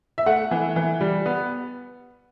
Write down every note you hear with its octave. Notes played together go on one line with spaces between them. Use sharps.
E5
A3 F#5
E3
E3
G3
B3